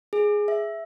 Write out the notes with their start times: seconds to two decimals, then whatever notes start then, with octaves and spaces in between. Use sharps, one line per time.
0.13 G#4
0.48 E5